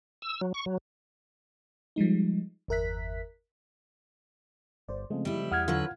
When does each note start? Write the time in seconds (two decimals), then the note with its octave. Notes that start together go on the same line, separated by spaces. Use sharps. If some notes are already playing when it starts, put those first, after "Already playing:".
0.22 E6
0.41 F#3
0.54 C#6
0.66 F#3
1.96 F3 G3 G#3 D#4
2.68 G1 E2 A#4 E5 F#6 B6
4.88 G1 C5 D5
5.10 C#3 F3 G#3 A3 C4
5.25 G3 E4
5.52 E2 F#5 D#6 F6 G#6
5.68 D3 F#3 F4 B4